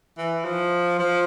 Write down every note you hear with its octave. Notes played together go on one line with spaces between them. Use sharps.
E3
F3
F3